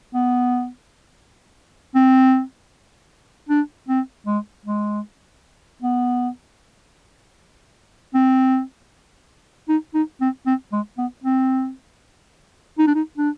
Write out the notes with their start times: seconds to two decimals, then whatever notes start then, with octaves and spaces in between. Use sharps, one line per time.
0.14 B3
1.95 C4
3.49 D4
3.89 C4
4.27 G#3
4.65 G#3
5.82 B3
8.14 C4
9.69 D#4
9.94 D#4
10.21 C4
10.46 C4
10.72 G#3
10.98 B3
11.24 C4
12.79 D#4
12.87 D4
12.95 D#4
13.18 D4